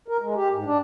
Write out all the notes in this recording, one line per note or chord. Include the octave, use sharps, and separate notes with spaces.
A#4
G#3
G4
G#2
D4